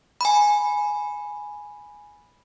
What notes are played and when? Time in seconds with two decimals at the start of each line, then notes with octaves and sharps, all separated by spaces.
0.21 G#5 B5